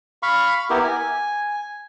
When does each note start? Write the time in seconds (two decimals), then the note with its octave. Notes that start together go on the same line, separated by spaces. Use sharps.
0.23 F5 B5 C#6
0.70 B3 E4 G4 A#4
0.84 G#5